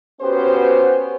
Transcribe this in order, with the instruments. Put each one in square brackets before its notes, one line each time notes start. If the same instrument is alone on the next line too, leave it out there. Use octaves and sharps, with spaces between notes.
[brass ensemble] B3 C#4 F#4 G4 B4 C5